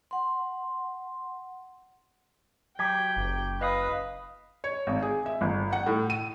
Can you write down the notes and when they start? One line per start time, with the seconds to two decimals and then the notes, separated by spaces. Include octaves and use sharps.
0.11 F#5 C6
2.79 F#3 G4 G5 G#6 B6
3.17 F#1
3.61 B4 D#5 F5 D#6
4.64 C#5
4.87 G#1
5.02 G#4
5.26 E5
5.41 G1
5.73 F#5
5.86 A2
6.10 D#7